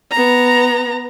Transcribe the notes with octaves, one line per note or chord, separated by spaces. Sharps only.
B3 A#5